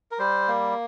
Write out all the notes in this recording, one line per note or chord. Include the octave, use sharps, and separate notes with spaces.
A#4
G3 C5
A#3